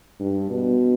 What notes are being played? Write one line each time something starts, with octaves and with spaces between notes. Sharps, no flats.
G2
B2